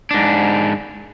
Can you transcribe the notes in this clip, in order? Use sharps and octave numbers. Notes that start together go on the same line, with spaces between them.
G#2 D4